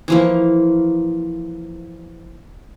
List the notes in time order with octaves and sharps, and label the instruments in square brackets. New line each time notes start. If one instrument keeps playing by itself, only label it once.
[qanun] E3 F3 A#3